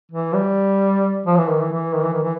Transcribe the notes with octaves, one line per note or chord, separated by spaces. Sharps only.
E3
G3
F3
E3
D#3
E3
E3
D#3
E3
D#3
E3